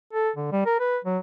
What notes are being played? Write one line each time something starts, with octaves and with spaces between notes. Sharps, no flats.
A4
D3
G3
A#4
B4
F#3